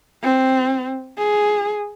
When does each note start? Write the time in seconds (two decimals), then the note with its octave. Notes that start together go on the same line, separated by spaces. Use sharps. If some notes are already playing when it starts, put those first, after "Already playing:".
0.23 C4
1.18 G#4